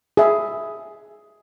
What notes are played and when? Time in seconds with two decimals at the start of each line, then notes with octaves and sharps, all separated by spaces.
0.17 G#4 E5